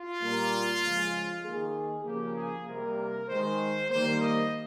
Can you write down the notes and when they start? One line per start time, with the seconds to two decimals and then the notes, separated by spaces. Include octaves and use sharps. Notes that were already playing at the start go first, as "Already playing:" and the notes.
Already playing: F4
0.21 A#2 G3 A#3
0.82 C#3 F3 G#3
1.44 D#3 A#3 G#4
2.05 C#3 F3 A#3 G4
2.35 G#4
2.67 C3 G3 A#3 A#4
3.28 D#3 G#3 C5
3.90 D#3 G3 A#3 C5
4.21 D#5